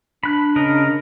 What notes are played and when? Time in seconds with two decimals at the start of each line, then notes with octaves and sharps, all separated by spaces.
0.23 D4 B5 F#6
0.56 C#3 A#4 D#5